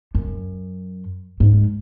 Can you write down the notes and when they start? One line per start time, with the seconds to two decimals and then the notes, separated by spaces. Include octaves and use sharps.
0.15 F#2
1.40 G#2